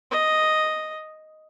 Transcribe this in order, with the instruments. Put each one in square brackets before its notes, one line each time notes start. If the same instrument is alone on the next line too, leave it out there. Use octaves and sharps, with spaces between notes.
[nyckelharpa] D#5